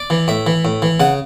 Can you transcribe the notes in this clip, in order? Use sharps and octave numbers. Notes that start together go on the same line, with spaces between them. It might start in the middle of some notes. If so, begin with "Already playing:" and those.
Already playing: D5
E3
A2 E5
E3
A2
E3
C#3 F#5